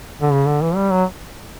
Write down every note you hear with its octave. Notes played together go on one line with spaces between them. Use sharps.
D3
C#3
D3
E3
G3
F#3